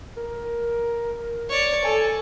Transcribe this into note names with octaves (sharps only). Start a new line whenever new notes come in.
A#4
C#5 D5
A4 G#5